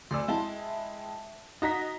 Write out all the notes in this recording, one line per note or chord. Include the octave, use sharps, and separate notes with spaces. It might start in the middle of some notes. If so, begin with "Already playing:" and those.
D2 D5 C6 E6
G#3 E4 E5 G5 A5
D#4 F#4 D#5 A#5 A#6 B6